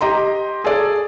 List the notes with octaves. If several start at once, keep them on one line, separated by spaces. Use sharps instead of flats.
G4 D#5 A#5 C6
G#4 A4 D5